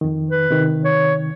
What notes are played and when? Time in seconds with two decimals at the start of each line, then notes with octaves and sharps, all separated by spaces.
0.01 F2 D#3
0.30 B4
0.51 C3 D#3
0.85 C#5